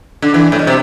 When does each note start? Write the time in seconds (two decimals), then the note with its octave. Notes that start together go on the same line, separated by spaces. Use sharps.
0.22 D3
0.34 E3
0.52 A2
0.59 B2
0.67 C3